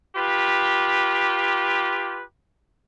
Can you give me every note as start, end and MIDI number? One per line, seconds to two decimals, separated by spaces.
0.16 2.21 65
0.16 2.21 67
0.16 2.21 71